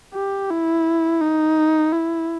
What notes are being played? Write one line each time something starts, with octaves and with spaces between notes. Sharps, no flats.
G4
E4
D#4
E4